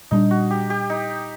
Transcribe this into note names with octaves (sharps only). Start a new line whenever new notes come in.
A#2 G3 D4 D#4
F#4
G4
G4
D#4